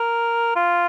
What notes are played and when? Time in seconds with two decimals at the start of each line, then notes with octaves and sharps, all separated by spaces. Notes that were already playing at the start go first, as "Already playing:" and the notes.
Already playing: A#4
0.56 F4